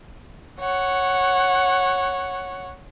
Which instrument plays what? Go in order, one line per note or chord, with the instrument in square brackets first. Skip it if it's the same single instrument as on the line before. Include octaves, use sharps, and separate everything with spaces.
[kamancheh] C#5 F#5